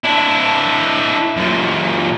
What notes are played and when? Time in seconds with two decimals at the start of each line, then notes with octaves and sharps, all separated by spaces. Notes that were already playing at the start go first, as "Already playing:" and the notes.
0.04 D4 E4
1.37 F#2 A#2